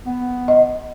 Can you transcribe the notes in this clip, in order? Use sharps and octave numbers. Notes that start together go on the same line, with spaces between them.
B3
D#5